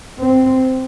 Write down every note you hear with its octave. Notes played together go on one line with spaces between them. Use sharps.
C4